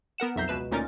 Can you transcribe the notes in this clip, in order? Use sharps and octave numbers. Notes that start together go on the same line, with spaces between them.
B3 A#4 F#5 E7
B1 F2 E5 A#5 G6 C7
C#2 B2 B4 E7
D2 A#2 C#4 D#4 A#4 A6